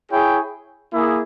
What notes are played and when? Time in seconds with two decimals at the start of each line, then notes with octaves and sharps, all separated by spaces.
0.10 E4 G#4 C#5 G5
0.93 A#3 E4 G#4